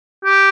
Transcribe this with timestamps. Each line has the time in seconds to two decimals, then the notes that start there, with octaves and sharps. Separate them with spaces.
0.25 G4